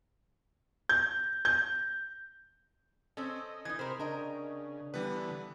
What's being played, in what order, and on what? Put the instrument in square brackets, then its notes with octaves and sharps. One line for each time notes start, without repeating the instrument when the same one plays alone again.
[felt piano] G6
G6
[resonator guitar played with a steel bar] C4 C#4 [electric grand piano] A4 [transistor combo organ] D#5
[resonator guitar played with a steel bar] E3 D#4 [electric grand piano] G#6
[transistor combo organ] C3 B5 F6 [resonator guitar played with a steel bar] A#4 C5
[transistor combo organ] C#3 [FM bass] D4 [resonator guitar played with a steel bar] A#4 D#5 G5
[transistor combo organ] D3 E3 B3 [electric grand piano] G3 B4